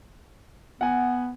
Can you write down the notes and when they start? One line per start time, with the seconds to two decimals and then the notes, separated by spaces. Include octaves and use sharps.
0.81 B3 F#5 G#5